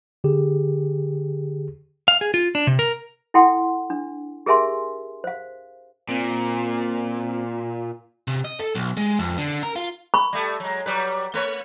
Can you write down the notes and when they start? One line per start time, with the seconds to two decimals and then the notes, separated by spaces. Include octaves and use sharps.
0.24 D3 G4 G#4
2.08 F5
2.21 G#4
2.34 F4
2.55 D4
2.67 C3
2.79 A#4
3.34 E4 A4 F#5 G5 C6
3.90 D4
4.46 G4 G#4 A#4 E5 G#5 C6
5.24 C5 F5
6.09 A#2 C4
8.28 C3
8.45 D#5
8.59 A4
8.75 B1
8.97 G#3
9.19 F2
9.38 D3
9.63 A#4
9.76 F4
10.14 B5 C#6
10.33 G3 A3
10.60 F#3 G#3
10.86 F#3 G3 B4
11.34 A3 B4 C#5